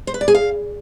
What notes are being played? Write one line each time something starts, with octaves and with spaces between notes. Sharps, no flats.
C5
B4
D5
G#4
F5